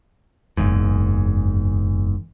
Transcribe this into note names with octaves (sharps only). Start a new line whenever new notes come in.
F#1 E2 G#2